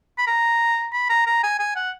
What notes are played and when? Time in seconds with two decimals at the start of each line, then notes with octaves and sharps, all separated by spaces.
0.18 B5
0.27 A#5
0.93 B5
1.10 A#5
1.26 A#5
1.44 G#5
1.60 G#5
1.76 F#5